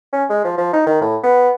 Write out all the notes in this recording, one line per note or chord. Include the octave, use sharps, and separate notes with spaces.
C#4
G#3
F3
F3
D#4
D#3
A2
B3